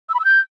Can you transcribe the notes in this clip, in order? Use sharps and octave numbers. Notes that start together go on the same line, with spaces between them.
E6
B5
E6
G6